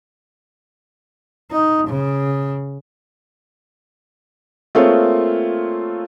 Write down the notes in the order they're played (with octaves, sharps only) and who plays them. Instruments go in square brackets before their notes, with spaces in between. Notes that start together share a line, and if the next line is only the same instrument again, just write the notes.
[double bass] D#4
C#3
[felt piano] A3 A#3 C4 F4 G#4 C#5